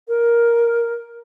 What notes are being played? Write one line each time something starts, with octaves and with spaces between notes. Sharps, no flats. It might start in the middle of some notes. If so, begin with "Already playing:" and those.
A#4